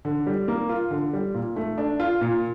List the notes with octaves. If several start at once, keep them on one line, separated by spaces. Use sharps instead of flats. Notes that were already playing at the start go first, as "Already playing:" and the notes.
D3
G3
A#3
F4
D3
G3
A#2
A3
D4
F4
A#2